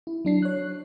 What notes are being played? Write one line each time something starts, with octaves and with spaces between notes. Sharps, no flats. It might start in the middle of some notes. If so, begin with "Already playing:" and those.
E4
F#3 D4 C7
C#5 F#6